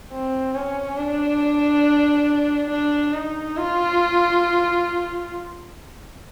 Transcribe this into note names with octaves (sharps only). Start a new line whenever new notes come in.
C4
C#4
D4
D4
D#4
F4